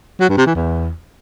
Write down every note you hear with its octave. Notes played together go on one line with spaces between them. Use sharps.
F#3
G2
C3
E3
E2